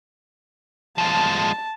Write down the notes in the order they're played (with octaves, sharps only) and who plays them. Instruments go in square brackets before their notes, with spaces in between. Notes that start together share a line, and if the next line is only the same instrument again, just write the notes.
[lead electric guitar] F3 G#3 [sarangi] A5